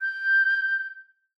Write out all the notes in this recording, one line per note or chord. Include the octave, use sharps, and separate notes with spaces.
G6